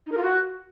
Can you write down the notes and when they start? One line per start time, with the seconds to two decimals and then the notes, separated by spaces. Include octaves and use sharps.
0.06 D#4
0.12 A#4
0.17 F4
0.23 F#4